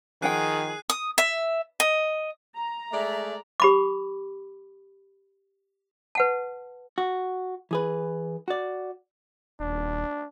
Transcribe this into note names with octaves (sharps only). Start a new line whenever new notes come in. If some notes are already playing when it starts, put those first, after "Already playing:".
D#3 F3 G#4 F#5 G5 F#6 C7 D#7
D#6
E5
D#5
A#5
G#3 A3 D5 E5
G4 B5 D6
B4 F#5 A5
F#4
E3 G#4 B4
F#4 D5
D#1 D4